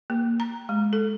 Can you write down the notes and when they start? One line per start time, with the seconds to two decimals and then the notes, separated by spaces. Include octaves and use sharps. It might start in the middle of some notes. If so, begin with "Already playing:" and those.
0.10 A#3
0.40 A#5
0.69 G#3
0.93 A4